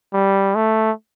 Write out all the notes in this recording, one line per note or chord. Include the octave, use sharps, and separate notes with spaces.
G3
A3